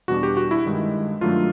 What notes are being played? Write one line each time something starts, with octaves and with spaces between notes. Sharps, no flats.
E2 B2 G3 B3 D4 F#4
G4
F#4
E4
G2 D#3 G#3
G2 D#3 F#3 A3 D4 F4